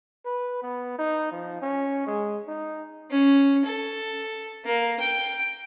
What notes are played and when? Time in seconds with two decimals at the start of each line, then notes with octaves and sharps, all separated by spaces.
0.25 B4
0.62 B3
0.99 D#4
1.31 F3
1.62 C#4
2.07 G#3
2.47 D#4
3.11 C#4
3.65 A4
4.65 A#3
5.00 G5